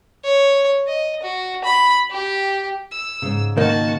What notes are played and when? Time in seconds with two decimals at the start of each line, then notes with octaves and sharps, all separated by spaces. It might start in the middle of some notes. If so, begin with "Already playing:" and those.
0.24 C#5
0.87 D#5
1.23 F#4
1.64 B5
2.11 G4
2.91 E6
3.22 G#2 C#3
3.57 D#3 A#3 F#4 A5